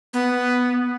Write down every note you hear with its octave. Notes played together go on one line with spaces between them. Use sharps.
B3